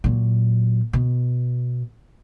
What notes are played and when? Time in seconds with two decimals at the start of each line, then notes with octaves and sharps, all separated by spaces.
0.04 A#2 F#3
0.93 B2